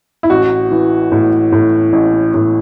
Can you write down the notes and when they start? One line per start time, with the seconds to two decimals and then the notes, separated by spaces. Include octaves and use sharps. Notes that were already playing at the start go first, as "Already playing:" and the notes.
0.23 E4
0.30 A1 F#4
0.71 E3
1.12 A2
1.52 A2
1.93 A1
2.34 A2